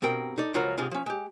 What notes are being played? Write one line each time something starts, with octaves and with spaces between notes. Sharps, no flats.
G2 B2 C4 A#4 G5
D#4 A4 D5
C#2 F3 F#3 F4 F#4 A#4
G#2 C3 G#3 F4 C6
F3 C#4
G#3 G4